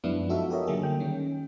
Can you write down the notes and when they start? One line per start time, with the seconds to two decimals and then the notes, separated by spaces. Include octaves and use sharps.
0.04 F#2 F3 G#3 B3 D4 E4
0.29 D#4 F4 F#4 A4 E5
0.50 G4 A4 A#4 C#5 D#5 E5
0.67 D3 F#3 A#3 G#4
0.82 G3 G5
1.00 D#3 C#4